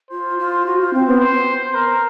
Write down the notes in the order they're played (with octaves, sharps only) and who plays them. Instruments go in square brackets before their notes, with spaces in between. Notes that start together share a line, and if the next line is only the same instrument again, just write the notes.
[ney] F4 [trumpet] C5
[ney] F4
F#4
F4
C4
B3
[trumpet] C5
A#4